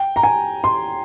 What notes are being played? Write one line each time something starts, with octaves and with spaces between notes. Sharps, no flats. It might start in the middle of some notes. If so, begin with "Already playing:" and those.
Already playing: G5
A#5
G#5
C6